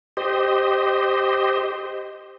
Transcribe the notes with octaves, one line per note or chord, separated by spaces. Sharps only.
G4 C5 D#5